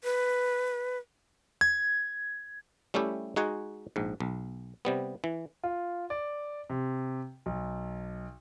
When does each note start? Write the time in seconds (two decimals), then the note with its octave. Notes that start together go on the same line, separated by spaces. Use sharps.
0.04 B4
1.61 G#6
2.94 G3 A3 C#4 E4 G4
3.36 G#3 D#4 F#4 F#5 G#5
3.96 A#1 G#2
4.20 B1
4.85 C3 G3 B3
5.24 E3
5.64 F4
6.10 D5
6.70 C3
7.46 B1